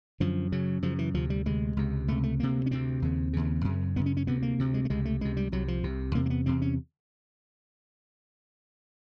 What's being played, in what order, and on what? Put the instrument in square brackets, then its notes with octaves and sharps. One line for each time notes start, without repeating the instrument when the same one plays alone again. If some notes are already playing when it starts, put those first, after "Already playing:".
[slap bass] F#2 D3 F3
F#2 C#3 F#3
F#2 C#3 F3
E3
D2 C3 F3
G3
D2 C3 G#3
C#2 C3
C#2 C3 A3
A3
D2 C3 A#3
C#4
D2 C3 C4
D#2 C#3
D#2 C#3
F#2 C#3
F#2 C#3 B3
C#4
C#4
D2 C3 B3
A#3
D2 C3
G#3
A3
C#2 C3 G#3
A3
C#2 C3 G#3
G3
C2 C3 F#3
F3
C2 C3
E2 C3 A#3
A#3
B3
E2 C3 C4
C#4